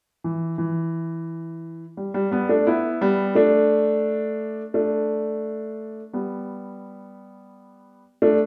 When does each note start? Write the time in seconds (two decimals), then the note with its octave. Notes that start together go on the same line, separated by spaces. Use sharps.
0.24 E3
0.58 E3
1.97 G3
2.14 G3
2.31 G3 B3
2.49 A3 D4
2.67 B3 E4
3.01 G3 B3
3.35 A3 D4
4.74 A3 D4
6.13 G3 B3
8.22 A3 D4